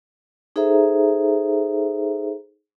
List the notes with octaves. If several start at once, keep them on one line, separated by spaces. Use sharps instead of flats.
D#4 G#4 A4 C5 E5 A#5